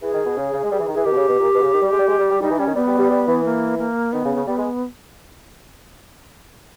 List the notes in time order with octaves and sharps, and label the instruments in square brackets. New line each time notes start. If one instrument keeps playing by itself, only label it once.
[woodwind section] E3 [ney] G#4
[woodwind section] D#3
B2
C#3
C#3
G#3
G3
E3
D#3
[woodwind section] E3 [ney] G#4
[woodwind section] D#3 [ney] G4
[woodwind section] B2
C#3
B2
A#2
B2
C#3
D#3
G3
G#3
G3
G#3
G3
G3
[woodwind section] G3 [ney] D#4
[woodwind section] E3
[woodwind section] G3 [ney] C#4
[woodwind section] D#3
[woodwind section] G3 [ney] B3
[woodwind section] G3
G3
G3
E3
[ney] A#3
A#3
[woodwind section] D#3 [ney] B3
[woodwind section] C#3
C#3
[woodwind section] G3 [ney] B3
[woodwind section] G#3